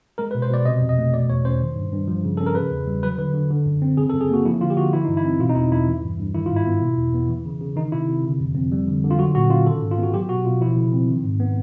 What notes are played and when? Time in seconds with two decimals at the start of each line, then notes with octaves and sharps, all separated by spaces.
0.18 G#3 A#4
0.31 B4
0.35 B2
0.42 C5
0.50 B2 D5
0.65 C3 D#5
0.81 F2
0.89 D#5
0.98 A3
1.13 B2 D5
1.29 E2 C#5
1.45 C#4 C5
1.60 D#3
1.76 G2
1.92 G2
2.08 F3
2.25 C#3
2.37 C#4 A4
2.46 A#4
2.55 C#3 B4
2.71 E2
2.87 G3
3.03 F#3 B4
3.18 D3 B4
3.34 D3
3.50 D3
3.66 F#2
3.82 C4
3.97 C#3 G#4
4.10 A4
4.14 F#2
4.21 G#4
4.29 A#3 F#4
4.45 F3 E4
4.60 D3 F4
4.70 G4
4.77 D3 F#4
4.93 E3 E4
5.04 G2 D#4
5.17 E4
5.24 C4
5.40 B2 F4
5.49 D#4
5.55 E2 E4
5.71 E2 E4
5.88 E3
6.03 G2
6.19 G2
6.34 D#3 E4
6.46 G#2 F4
6.56 E4
6.67 B3
6.81 B2
6.97 E2
7.14 B3
7.29 E3
7.46 C#3
7.61 C#3
7.76 D#3 D#4
7.92 C3 E4
8.08 C3
8.24 D3
8.40 F2
8.55 F2
8.72 G3
8.87 D3
9.04 D3
9.11 F4
9.19 F#3 F#4
9.35 A#2 F#4
9.50 C#4 F4
9.66 D#3 A4
9.82 G#2
9.91 F4
9.98 B3
10.03 F#4
10.14 F#3 G4
10.29 B2 F#4
10.45 B2 F4
10.61 F3 E4
10.77 C#3
10.93 C4
11.08 D#3
11.24 G#2
11.40 B3